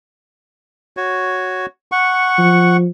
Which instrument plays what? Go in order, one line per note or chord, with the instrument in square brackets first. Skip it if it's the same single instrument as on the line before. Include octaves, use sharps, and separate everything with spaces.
[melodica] F#4 C#5
F#5 C#6
[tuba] F3